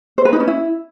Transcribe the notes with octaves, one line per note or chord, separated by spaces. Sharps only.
C5
B4
D#4
C#4
E4